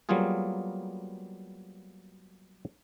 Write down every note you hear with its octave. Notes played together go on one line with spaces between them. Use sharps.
F#3 G3 A#3 B3 F4 G#4